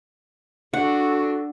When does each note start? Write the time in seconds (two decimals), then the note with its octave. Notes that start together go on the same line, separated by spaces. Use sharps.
0.73 D4 F#4 A4 F#5